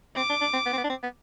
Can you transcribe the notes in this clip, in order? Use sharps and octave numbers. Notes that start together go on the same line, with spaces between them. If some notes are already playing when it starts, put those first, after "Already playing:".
C4 D6
D4
D4
C4
B3
C4
B3
D4
C4
B3